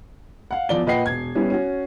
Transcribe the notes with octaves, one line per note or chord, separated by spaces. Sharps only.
F5 F#5
E2 F3 D5 G7
A#2 B4 D#5 F#5 G5 C7
E1 G#6
G3 B3 C#4 E4
C#4 F#4